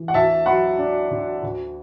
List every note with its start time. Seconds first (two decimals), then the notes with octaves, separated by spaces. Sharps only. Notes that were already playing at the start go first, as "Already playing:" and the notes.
Already playing: E3
0.08 F#5
0.14 D2 E5 A5
0.46 F#3 F#5 B5
0.78 D4
1.11 D3
1.43 D2